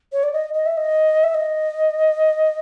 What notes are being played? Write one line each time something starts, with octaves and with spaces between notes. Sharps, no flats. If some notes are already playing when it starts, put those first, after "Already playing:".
C#5
D5
D#5
D#5
E5
D#5
E5
D#5